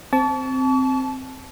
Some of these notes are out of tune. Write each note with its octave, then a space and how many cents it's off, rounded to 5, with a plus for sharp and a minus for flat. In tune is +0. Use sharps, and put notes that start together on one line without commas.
C4 -5 A5 -20 C#6 +45